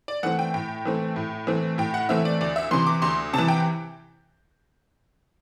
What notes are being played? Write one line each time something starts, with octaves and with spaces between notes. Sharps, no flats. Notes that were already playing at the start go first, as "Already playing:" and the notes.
D5
E3 A3 C4 F#5
G5
A2 G5
E3 A3 C4
A2
E3 A3 C4
A2 G5
F#5
E3 A3 C4 E5
D5
D2 D5
E5
C3 E3 C6
D6
D2 C6
C3 E3 A5
G5